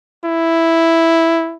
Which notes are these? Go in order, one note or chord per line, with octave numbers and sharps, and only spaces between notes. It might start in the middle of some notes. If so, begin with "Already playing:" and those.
E4